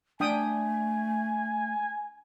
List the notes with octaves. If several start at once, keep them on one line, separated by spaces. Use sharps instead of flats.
A3 D4 G5 G#5 D#6